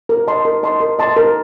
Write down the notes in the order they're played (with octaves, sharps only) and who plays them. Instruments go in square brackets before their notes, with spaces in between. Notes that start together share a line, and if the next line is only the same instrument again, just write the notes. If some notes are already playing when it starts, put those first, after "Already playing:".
[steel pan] A#4
D#5 A5 C6
A#4
D#5 A5 C6
A#4
D#5 A5 C6
A#4